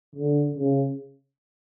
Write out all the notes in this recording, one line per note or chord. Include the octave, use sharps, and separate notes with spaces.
D3
C#3